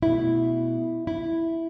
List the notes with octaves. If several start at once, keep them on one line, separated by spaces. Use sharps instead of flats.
B2 A3 E4
E4